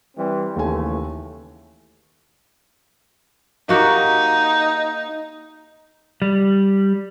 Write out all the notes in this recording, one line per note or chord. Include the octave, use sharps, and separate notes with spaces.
E3 G3 C4
D#2 C#3 E3 A3 G#5
A#3 D#4 F#4 G4
G3